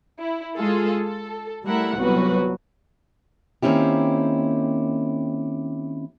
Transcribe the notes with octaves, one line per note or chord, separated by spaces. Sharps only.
E4
G#3 F4 G#4 A4
A4
G3 A3 E4 A#4 E5 F#5
G1 C2 F#3 F#4 B4
D#3 A#3 C4 C#4 E4 G4